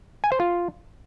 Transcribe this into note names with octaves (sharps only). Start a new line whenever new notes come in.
G#5
C5
F4